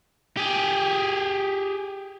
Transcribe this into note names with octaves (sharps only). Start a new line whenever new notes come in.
G4 G#4